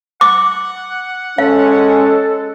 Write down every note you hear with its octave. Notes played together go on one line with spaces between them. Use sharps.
F#5 D6
G#3 C#4 A4 F5